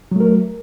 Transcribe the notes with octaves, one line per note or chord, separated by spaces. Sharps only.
F#3 A3 A#4